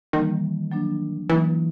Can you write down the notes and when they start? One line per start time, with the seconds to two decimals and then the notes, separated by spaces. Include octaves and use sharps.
0.13 D#3 E3 G3 A#3
0.72 F#3 A#3 D4
1.30 E3 F#3 A#3 D#4